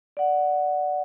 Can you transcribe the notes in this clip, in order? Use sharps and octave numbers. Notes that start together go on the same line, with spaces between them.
D5 F#5